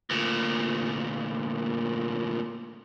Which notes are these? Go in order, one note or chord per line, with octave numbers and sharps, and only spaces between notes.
D2 A#2